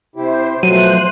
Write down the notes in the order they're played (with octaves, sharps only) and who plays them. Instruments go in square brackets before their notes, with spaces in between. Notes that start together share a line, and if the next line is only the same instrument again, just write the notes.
[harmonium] C3 E4 G4 [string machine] C5
[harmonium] B2 F3 A3 [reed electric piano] F#3 [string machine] C5 F#6 [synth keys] D#7